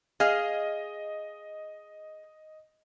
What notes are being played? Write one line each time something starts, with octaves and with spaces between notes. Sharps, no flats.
G#4 D#5 F5